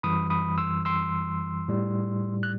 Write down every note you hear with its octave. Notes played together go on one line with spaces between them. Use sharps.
F#2 E3 G3 B5 D#6
B5 D#6
C6 E6
C6 E6
A2 G3
F#6